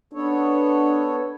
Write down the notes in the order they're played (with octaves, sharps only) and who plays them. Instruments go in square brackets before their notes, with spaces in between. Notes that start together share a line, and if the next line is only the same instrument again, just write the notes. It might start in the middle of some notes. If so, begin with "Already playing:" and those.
[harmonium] B3 A4 C#5 [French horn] D4